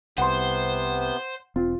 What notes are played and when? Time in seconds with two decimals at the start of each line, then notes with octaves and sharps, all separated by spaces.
0.18 C2 C3 B3 C5 F#5 C6
1.56 E1 C4 F4